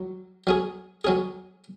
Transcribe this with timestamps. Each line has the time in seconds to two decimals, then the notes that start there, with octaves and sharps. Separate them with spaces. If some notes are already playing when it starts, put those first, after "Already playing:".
Already playing: F#3
0.47 F#3 C#4 G#4
1.04 F#3 C#4 G#4